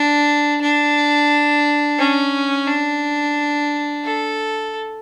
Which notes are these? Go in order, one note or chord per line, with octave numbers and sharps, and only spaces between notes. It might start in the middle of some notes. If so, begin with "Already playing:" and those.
Already playing: D4
D4
C#4
D4
A4